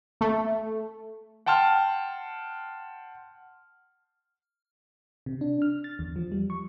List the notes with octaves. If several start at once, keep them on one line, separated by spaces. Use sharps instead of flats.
A3
F#5 G5 A5 C6 F6
C3
D4
F6
A6
E2
F3
G3
C#6